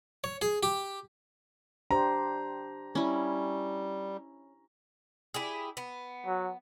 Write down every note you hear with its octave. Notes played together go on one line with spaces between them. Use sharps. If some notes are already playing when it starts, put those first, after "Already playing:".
C#5
G#4
G4
D4 G4 C5 A#5
G3 C#4 E4
E4 G4 G#4
B3
F#3